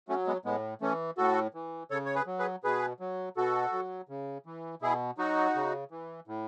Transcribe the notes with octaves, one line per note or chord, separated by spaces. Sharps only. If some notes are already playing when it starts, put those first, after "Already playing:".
F#3 A3 C#4
G#3 B3
A2 G#3 B3
E3 A3 C#4
A2 F#4 A4
E3
C#3 A4 C#5
C#5
G#4 B4
F#3
G#4 B4
B2 G#4 B4
F#3
B2 F#4 A4
F#3
C#3
E3
B2 E4 G#4
F#3 D#4 F#4
C#3
E3
A2